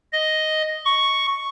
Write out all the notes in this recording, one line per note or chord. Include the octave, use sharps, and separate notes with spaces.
D#5
C#6